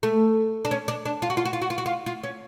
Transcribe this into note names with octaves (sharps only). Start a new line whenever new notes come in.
A3
D4
C#4
D4
D4
F4
F#4
F4
F#4
F4
F#4
F4
F#4
F4
F4
C#4